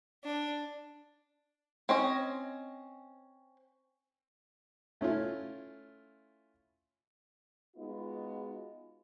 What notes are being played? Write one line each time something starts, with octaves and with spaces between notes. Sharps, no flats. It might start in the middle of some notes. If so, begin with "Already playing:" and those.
D4
C4 C#4 D#5
A3 C#4 E4 F4
G#3 B3 D#4 F4 F#4